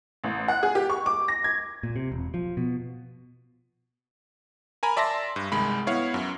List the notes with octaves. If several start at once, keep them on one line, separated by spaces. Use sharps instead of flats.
A1
F#5
G#4
G4
C#6
D6
A#6
G#6
A#2
C3
E1
F3
B2
A#4 G#5 A#5 B5
D5 E5 A5 C6 A#6
G2
C2 D#3 G#3 B5
B3 E4 C#5 F5 F#5
F#2